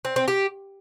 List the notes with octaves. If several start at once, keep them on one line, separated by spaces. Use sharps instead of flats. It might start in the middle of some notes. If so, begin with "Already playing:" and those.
C4
C4
G4